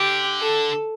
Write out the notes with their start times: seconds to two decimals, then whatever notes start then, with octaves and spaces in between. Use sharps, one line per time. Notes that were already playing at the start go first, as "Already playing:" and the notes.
Already playing: D3 G4
0.39 A4